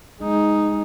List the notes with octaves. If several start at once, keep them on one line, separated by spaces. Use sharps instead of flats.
G#3 D#4